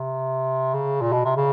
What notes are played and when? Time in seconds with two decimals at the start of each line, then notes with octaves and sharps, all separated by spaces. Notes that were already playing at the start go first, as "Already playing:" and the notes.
Already playing: C3
0.74 C#3
1.01 A#2
1.12 B2
1.25 C3
1.37 C#3